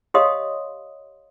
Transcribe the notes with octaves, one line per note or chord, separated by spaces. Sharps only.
G4 C#5 D#5 F5 C6 D#6